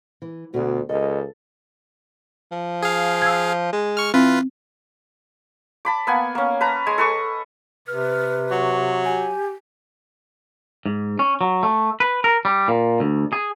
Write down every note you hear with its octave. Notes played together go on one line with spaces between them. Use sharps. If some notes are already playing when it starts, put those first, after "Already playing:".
E3
D2 B2 F#4 D5
C#2 A4 D#5
F3
G#4 F5
E6 G#6
G#3
C#6 F6
E3 C4 F4 B4
A5 B5 D6
A#3 B3 F#5 G#5
A#3 C#4
B4 A5 A#5
G#3 G#5
A4 B4 D#5 C#6
C3 B4 F6
F#3 C#6
G4 G#5
G#2
C#4
F#3
A3
B4
A#4
G3
A#2
D2
G#4